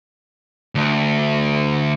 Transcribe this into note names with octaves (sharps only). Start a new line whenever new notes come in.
D2